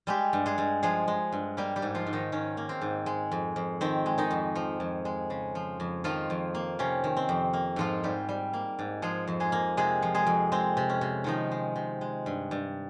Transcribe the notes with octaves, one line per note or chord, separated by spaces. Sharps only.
G3 G#3 G4
G2
G#3 G#4
G2
F3 G#3 G#4
G#3
G2
G3 A#3 G4
G3 G4
G#2
F3 F4
G#2
D#3 D#4
D#3 C#4
A#3
C4
G#2
G#3
F2
F2
D#3 C4
G#3
D#3 D#4
F2
F3
F2
G#3
C#3
F3
F2
D#3 F3 F4
F2
A#3
C3 C#4
D#3
C4
F2
A#3
G#2 F3 F4
G#2 G3 G4
G3
A#3
G#2
F3 G#3 G#4
F2
G#3 G#4
A#3
C3 G#3 G#4
F3
G#3 G#4
F2
G#3 C4
C3
C#4
C3
D#3 F3 D#4
G#3
C3
G#3
G2
G2